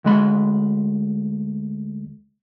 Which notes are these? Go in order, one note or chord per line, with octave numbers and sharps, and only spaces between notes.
D2 G#3 B5